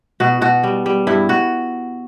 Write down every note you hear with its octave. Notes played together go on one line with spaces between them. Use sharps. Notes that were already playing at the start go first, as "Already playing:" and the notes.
B2 F#4
B2 F#4
G3
G3
G2 E4
F#4